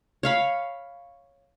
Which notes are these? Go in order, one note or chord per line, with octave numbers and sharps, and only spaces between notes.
C#5 F5 B5